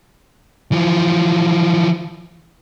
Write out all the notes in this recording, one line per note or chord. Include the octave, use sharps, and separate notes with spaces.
E3 F3